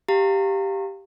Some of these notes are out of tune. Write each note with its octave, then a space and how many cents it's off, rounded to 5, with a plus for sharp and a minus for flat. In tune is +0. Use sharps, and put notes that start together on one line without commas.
G4 +0 F5 +0 A#5 -30